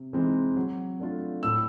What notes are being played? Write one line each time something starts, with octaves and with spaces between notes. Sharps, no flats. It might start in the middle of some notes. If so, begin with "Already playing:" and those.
Already playing: C3
E3 G#3 C4 D#4
F#3
A3 D4 F4
A2 E6